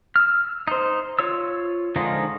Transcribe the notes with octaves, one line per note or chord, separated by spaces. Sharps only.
E6 F6
D#4 C5
F4 C#5 E6
D3 D#3 F3 G#3 D#4